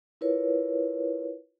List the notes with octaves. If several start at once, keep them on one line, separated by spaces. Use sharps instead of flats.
E4 F4 A#4 B4 C#5